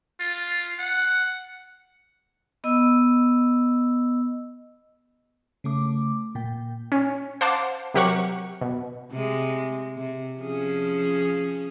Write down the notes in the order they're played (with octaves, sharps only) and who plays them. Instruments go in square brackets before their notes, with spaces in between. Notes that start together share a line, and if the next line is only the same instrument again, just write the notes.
[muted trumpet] F4
F#5
[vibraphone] B3 D#5 E6
[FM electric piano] C#3 A3 D6
A#2 G5
[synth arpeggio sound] C#4
C5 F5 F#5 A5 D6 C7
C3 F#3 G4 A#4 F#5 C#6
B2
[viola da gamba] C3 G#3
C3
F3 C#4 G#4